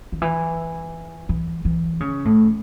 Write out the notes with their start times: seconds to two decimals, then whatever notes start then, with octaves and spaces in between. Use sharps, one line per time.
0.12 D#3
0.22 E3
1.29 E3
1.65 E3
2.00 C#3
2.25 A2